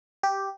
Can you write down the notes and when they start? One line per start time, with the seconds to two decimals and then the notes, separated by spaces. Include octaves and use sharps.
0.23 G4